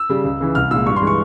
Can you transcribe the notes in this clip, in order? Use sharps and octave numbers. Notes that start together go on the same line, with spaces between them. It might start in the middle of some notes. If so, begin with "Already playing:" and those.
Already playing: E6
C#3 G3
C#2
C#3 E3
C2 F6
A#2 G#3 E6
G2 C#6
C6
E3 G#3
C#6